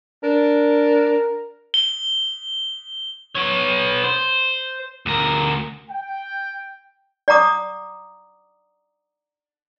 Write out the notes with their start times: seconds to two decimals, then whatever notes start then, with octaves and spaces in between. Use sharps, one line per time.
0.23 D4 A#4
1.74 G7
3.35 B3 C#5
4.04 C5
5.06 D2 A#4
5.91 G5
7.28 D5 F#5 A#5 D6 D#6